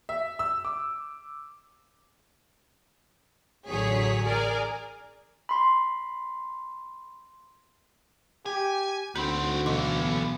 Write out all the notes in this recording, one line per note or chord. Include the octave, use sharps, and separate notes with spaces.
E5
E6
D6
A1 D3 F#3 G#4 C#5 B6
G#4 A#4 D5 G#5
B5 C6
G4 G#5
D2 C4 D#4 F#4 B5
B1 E3 A4
B3